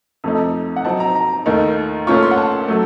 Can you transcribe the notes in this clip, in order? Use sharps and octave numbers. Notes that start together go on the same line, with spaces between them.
F2 C3 F3 A3 D#4
F#5
C3 F#3 C4 D#4 A5
A#5
A#5
D#2 D#3 A3 D#4
A#2 A3 C#4 F4 C#6
C6
F#5
A5
F#3 A3